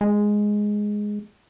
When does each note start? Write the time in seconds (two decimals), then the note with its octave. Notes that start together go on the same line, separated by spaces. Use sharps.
0.01 G#3